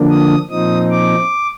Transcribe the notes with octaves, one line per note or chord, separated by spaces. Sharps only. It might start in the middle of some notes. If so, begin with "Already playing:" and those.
Already playing: D3 F3 A#3 D4
D#6
A#2 F3 C4 D#4 D#6
D6